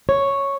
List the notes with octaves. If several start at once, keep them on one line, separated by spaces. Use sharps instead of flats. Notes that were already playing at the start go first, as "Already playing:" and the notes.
C#5